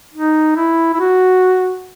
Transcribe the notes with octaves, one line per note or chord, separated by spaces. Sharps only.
D#4
E4
E4
F#4